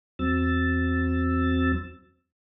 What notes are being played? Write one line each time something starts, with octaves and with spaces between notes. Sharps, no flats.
E2 F#3 C4 E6 A6